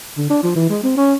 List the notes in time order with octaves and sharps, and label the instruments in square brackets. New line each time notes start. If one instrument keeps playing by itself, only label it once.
[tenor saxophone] D3
D4
F3
E3
G#3
C4
C#4